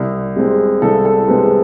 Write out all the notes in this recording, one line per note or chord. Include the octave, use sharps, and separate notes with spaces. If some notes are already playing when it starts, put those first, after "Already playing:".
Already playing: C2
C3 G#3 C4
C2 A4
A4
C3 G#3 C4 B4